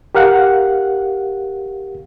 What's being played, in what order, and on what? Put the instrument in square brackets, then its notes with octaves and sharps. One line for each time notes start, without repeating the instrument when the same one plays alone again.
[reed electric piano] G4 A#4 F5 F#5